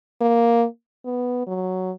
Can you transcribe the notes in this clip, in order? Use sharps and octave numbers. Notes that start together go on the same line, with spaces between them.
A#3
B3
F#3